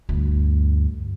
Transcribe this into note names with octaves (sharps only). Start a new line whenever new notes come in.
D2 G2